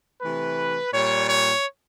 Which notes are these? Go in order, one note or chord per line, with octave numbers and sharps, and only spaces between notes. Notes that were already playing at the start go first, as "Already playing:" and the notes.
C3 E3 A3 B4
A#2 G3 C#5
C#5